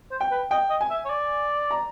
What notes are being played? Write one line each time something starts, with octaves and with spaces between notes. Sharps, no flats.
C5
G5
B4
D#5 G5
D#5
G#5
E5
C#5
D5
A#5